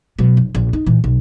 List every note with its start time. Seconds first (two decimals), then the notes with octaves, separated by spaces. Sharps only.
0.19 B2 F#3
0.37 F1
0.55 A#1
0.73 D#4
0.86 A#2 E3
1.04 B1